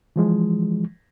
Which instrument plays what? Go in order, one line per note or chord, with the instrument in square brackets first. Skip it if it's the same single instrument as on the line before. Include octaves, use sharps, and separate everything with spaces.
[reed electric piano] E3 F3 G#3